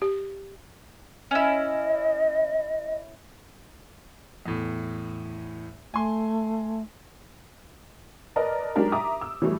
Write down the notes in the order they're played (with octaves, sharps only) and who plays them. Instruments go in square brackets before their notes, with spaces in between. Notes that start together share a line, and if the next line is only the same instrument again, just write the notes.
[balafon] G4
[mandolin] C#4 E4 [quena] D#5
[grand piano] E2 A2
[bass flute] A3 [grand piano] G#5 C6
[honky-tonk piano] A#4 B4 D5 D#5 A5
F#3 G#3 D4 D#4 G4 A#4
E5 A#5 D6 D#6
E6
E3 F#3 G3 A3